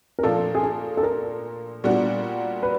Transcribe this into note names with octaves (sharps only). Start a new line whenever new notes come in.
A#4
A#2 F3 A3 D4 F4 A4
G#4
A4
A4
A#4
A#2 G3 B3 D4 F#4
B4